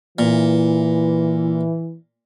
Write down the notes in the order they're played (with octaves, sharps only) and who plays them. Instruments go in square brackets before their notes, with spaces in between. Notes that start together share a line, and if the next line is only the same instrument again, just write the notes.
[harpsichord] A#2 [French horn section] E3